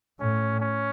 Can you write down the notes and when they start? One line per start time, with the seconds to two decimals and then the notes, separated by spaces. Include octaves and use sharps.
0.20 A2 C#4
0.60 C#4